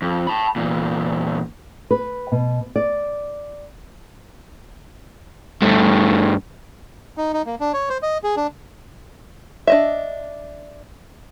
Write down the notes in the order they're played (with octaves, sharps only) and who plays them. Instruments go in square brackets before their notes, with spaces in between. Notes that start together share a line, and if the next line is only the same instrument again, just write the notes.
[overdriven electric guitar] F2
A5 B5
E2 A#2
[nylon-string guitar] B4
B2
D5
[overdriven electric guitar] G2 A3
[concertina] D#4
D#4
A#3
D4
C#5
C5
D#5
G#4
D4
[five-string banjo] D4 D#5 E5